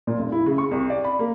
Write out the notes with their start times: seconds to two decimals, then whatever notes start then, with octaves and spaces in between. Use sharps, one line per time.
0.07 A#2
0.19 F1
0.32 E4
0.46 C#3
0.58 C#6
0.71 C2
0.90 D5
1.04 B5
1.19 A#3